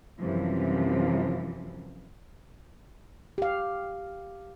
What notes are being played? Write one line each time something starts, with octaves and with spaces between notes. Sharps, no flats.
F#2 C3 E3 F3 G3
G4 F5